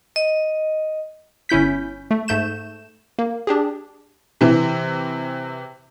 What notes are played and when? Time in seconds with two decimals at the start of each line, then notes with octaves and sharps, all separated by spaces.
0.16 D#5
1.49 G1 C#4 E4 G6 B6
2.11 A3
2.28 G#2 A3 G6 E7
3.19 A#3
3.47 D4 G4 G#4
4.41 C3 E3